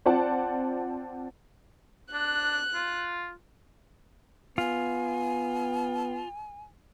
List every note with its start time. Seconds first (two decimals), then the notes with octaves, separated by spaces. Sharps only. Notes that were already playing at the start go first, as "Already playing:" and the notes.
0.06 C4 F4 C5 D5 F#5 A5
2.13 D4 F#6
2.74 F4
4.58 B3 F4 G#5